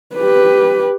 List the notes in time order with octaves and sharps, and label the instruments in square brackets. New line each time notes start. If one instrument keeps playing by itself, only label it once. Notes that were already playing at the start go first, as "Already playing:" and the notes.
[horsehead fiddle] G4 B4